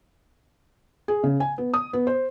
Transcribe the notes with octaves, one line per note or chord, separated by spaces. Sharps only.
G#4
C#3
G#5
B3
D#6
B3
C5